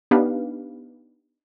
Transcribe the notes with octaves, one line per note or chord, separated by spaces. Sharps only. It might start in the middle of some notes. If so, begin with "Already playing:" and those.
B3 D4 D#4 G4 B4 F5